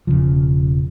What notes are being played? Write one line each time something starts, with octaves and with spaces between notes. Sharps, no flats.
E1 C#2 C#3 F3